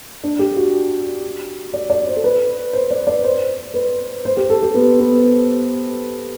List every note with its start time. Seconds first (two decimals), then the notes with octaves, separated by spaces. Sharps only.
0.23 D4
0.39 G4
0.56 F#4
1.73 D5
1.90 D5
2.07 C5
2.16 A4
2.24 B4
2.73 C5
2.90 D5
3.07 D5
3.24 C5
3.74 B4
4.25 C5
4.37 G4
4.50 A4
4.62 G4
4.74 B3
5.00 B3